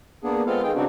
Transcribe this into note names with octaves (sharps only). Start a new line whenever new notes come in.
A#3 B3 D4 G#4
G#3 B3 C4 F4 A4 F5
D#3 G#4 G5
C#3 C4 D4 D#4 F#4